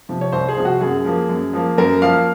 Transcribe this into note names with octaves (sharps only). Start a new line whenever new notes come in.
C3 F3
C#5
C2 C5
G#4
C3 F3
F#4
F#2 G#4
F3 A#3
F#2
F3 A#3
F#2 A#4
F3 A#3 F5